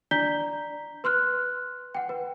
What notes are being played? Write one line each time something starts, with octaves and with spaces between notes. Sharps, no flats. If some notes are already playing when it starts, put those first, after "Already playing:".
D4 D5 A#5 G6 B6 G7
B4 C6 F6 F#6
F#5 G5
B4